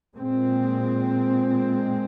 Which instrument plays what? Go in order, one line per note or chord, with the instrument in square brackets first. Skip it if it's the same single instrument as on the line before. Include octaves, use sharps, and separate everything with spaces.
[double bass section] A#2 G#3 C4